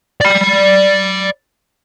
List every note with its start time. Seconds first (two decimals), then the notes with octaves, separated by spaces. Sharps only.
0.21 D5 B5